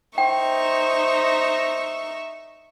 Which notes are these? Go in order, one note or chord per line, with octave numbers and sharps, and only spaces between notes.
D#4 C5 E5 G5 C#6